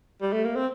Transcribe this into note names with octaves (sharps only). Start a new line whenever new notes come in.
G3
A3
A#3
C4